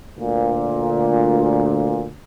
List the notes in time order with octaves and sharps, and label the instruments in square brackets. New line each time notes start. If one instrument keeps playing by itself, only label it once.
[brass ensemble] D2 A#2